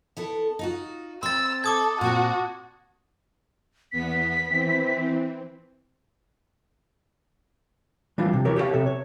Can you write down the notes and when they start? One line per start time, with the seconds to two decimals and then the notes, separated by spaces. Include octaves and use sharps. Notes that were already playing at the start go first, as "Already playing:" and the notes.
0.17 B3 E4 A4
0.59 D#4 F4 F#4
1.23 C4 C6 E6 A6
1.64 A4 D6 D#6 G#6
2.01 A#2 C4 F#4 A5
3.92 E2 B3 B6
4.49 E3 C4
8.18 E3 G3 D4 F4
8.33 C3
8.45 E3 G4 A#4 C#5
8.56 G4 G#4 C5 C#5 F5
8.73 C3 A4 E5
8.86 C#5